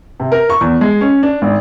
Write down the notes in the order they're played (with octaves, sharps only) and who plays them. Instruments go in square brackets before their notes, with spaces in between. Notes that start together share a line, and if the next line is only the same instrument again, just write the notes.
[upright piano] C3
A#4
C#6
E2
G#3
C#4
D4
G#1